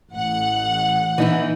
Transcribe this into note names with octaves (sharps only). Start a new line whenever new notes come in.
A1 F#5
E3 D#4 E4